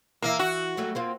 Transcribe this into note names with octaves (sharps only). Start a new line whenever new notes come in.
E3 A#3 D#5 E5
F#4
F#3 G3 A3
A#3 C4 F4